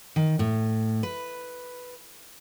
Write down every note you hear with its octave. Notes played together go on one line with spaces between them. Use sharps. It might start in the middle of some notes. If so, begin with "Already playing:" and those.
D#3
A2
B4